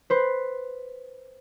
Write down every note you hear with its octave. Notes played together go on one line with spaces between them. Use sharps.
B4 C5